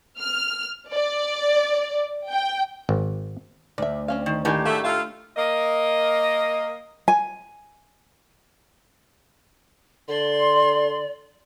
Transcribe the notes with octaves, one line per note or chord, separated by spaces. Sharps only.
F6
D5
G5
G#1
D2 D5 E5
C4 C#4 F5
D#3
A2 D#3 A#3 D4 G4 G#5
G#3 A3 F#4 A4 F5
F4 A4 E5 F5 A#5
A#3 D#5
G#5
D3 D5 C6